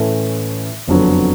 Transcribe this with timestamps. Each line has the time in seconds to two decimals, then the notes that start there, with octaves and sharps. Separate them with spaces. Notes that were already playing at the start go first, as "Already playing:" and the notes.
Already playing: A2 E3 A3 C#4
0.88 F#1 F2 D3 F#3 B3